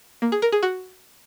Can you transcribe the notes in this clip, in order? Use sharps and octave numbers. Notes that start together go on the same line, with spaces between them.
A#3
G#4
A#4
G#4
F#4